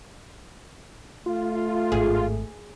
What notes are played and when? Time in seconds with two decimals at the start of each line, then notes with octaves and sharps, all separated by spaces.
1.26 A3 F4
1.92 G#1 A2 G#4